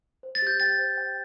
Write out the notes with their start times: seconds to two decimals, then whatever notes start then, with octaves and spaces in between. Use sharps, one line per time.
0.23 C5
0.35 A6
0.42 G4 G6
0.60 G5 A6
0.79 C5
0.97 G5